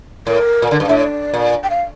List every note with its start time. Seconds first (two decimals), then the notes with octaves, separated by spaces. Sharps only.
0.27 A2 A#4
0.62 A#2
0.71 D3
0.80 G2
0.88 A2 E5
0.98 D5
1.34 A#2
1.63 G5
1.70 F5